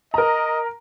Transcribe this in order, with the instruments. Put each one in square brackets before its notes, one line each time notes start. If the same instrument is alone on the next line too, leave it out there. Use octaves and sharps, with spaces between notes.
[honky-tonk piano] A#4 A#5 [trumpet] D#5